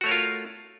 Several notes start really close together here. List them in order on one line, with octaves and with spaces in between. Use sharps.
F#4 A3 C#5 A#4 F4